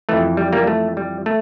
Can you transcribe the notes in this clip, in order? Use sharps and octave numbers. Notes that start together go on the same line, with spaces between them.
F2 E3 A3
G3
G3 A#3
A3
G3
A3